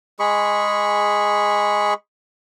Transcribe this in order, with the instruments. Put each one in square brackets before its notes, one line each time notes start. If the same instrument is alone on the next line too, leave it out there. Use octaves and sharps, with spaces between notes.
[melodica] G#3 G#4 B5 C#6